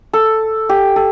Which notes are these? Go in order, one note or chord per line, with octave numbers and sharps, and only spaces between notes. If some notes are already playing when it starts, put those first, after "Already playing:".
A4
G4
A4